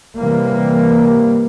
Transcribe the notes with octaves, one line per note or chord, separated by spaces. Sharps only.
C3 E3 G3 A#3